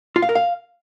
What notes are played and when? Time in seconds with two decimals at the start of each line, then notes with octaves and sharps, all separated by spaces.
0.16 F4
0.22 F5
0.29 A#4
0.35 F5